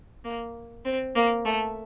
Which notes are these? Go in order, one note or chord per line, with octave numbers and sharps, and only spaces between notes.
A#3
C4
A#3
A3